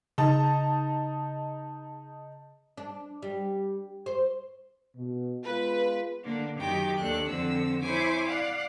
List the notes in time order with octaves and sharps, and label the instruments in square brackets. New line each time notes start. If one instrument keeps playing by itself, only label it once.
[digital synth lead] C#3 [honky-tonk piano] D#4 A5
[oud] D4
G3
C5
[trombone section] B2
[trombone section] G#3 B3 F4 [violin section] B4
[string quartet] D3 A#3 D4
F#2 D#3 D#4 G4 G5 D6
D#2 D4 A4 F#6
F2 D3 C4 A4 E6
E4 C5 C#5 G#5 D6
D5 F5 F#5